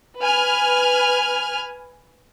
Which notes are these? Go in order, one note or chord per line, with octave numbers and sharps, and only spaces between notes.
B4 G#5 F6